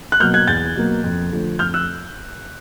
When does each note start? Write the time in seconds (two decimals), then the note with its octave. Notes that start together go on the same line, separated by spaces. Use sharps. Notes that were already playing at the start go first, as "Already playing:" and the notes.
0.12 F#6
0.20 B2 F#3 A#3 F6 G6
0.34 F#6 G#6
0.47 E2 G6 A6
0.76 B2 F#3 A#3
1.04 F2
1.32 D3 F3 A3
1.59 F2 F6 G6
1.74 E6 F#6